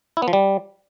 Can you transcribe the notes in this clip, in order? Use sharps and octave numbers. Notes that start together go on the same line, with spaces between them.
E4
B3
F3
G3